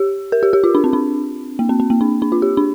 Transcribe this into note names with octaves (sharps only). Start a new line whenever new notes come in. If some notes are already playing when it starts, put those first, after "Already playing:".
Already playing: G4
A#4
G4
G4
F4
D4
C4
D4
A#3
C4
C4
A#3
D4
D4
F4
G4
D4